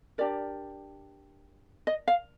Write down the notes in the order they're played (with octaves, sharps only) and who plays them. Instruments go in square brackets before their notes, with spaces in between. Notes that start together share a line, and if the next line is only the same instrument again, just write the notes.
[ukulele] D4 G4 A#4 D5
D#5
F5